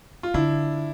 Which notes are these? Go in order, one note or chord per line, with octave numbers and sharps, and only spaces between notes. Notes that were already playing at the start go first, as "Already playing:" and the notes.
F4
D3 D4 E4